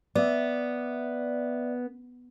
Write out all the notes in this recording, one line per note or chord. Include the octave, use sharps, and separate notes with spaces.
B3 D5 E5